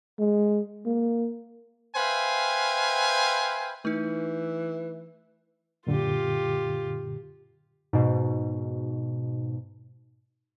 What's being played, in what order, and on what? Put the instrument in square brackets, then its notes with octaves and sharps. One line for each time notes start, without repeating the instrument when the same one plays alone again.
[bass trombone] G#3
A#3
[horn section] B4 C5 E5 F5 G5 G#5
[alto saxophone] E3 [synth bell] A3 D#4
[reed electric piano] F#2 A#2 D3 [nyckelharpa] F4 G4
[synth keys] G#2 B2